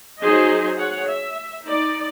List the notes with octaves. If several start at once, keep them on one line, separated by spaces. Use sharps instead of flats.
F#3 D#4 G#4 C5 D#5
G#4 C#5 F#5
E5
D#4 D5